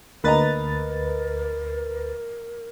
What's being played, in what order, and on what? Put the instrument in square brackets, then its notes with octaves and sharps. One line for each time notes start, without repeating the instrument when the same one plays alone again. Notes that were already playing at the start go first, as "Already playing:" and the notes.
[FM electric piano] D2 B4 A6 [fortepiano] A#3 D#5 A#5 [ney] A#4